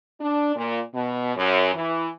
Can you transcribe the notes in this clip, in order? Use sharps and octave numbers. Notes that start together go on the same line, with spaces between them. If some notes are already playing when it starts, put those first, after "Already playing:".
D4
A#2
B2
F#2
E3